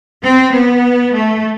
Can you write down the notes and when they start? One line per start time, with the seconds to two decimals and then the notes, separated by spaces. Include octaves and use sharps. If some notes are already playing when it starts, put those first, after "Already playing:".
0.23 C4
0.53 B3
1.13 A3